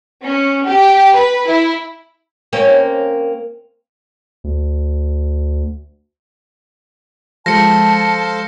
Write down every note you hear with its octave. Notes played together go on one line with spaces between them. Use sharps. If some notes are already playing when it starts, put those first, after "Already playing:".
C#4
G4
B4
E4
A#3 C4 C#4
D2
F3 G#3 A4 C5 F5 A5 A#6 C#7